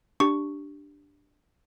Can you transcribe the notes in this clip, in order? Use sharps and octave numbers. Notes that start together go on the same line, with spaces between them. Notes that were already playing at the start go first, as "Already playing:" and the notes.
D4 G4 C#6